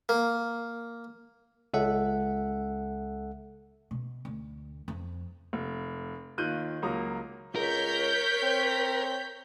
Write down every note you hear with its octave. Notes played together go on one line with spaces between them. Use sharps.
A#3
C#2 A4 E5 F#5
B2
D2
F2
F1
D#2 D#3 F4 F#6 G6 D#7
C#2 F#3 A#3 A#5 D#6
C#2 A#4 C#5 G6 B6
C4